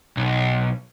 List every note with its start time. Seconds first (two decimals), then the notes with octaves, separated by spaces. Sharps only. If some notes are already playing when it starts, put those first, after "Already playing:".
0.17 B1